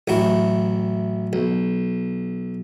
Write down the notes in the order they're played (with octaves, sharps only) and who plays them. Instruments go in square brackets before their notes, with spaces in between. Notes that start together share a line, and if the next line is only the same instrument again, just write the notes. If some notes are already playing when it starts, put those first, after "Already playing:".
[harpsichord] A1 F#3 E4
B1